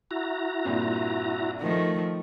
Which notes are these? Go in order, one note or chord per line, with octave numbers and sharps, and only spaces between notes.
E4 F#4 A#5
G2 A#2 C4
D#3 F3 A3